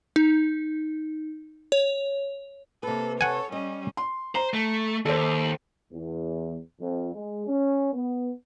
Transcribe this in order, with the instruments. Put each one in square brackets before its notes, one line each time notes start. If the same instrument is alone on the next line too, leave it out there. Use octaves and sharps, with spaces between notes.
[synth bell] D#4
C#5
[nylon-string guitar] C3 B4 [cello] A#3 A4
[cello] A4 C#5 [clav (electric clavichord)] F#5 G#5
[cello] G3 C#4 [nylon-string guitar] D#5
[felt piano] C6
[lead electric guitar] C5 [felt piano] A#5
[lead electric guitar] A3
[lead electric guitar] D#2 [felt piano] A4 C5
[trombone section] E2
F2
G#3
C#4
B3